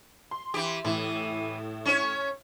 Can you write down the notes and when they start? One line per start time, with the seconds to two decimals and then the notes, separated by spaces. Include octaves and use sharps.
0.31 C6
0.54 E3 G4
0.85 A2 E3
1.85 C#4 C#5